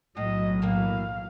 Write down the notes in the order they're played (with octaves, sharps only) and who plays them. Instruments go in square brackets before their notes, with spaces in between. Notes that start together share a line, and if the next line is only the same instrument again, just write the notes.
[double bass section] B1 F#3 [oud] A2 [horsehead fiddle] D#5
[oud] A2 E3 A#3 [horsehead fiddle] F5